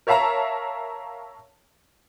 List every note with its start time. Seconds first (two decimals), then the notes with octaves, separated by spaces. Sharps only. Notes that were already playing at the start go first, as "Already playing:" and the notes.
0.07 A#4 C#5 E5 F5 A5 A#5